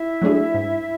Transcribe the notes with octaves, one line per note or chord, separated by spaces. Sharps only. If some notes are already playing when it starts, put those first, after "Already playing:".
Already playing: E4 E5
F#3 A3 D4 G#4
G#2